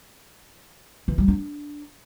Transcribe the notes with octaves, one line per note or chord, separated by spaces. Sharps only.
E3
G3
D4